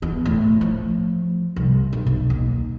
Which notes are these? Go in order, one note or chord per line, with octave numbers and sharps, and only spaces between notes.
E2
A2
F3
C2
B1
B1
D#2